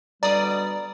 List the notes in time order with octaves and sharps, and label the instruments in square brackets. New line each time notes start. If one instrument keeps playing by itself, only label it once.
[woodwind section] B2 D3 G3 [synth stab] D5 D#6 [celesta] A#5